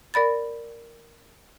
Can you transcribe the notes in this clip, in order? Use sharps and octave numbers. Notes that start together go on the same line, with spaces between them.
A#4 D5 B5 A6